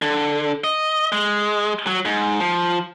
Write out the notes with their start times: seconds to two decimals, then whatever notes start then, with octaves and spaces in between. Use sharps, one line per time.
0.02 D3
0.64 D#5
1.12 G#3
1.87 F#3
2.05 G#2
2.40 F3